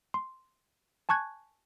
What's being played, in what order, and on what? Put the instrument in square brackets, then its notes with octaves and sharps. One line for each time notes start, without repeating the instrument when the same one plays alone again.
[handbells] C6
G#5 A5 C#6 F#6 G#6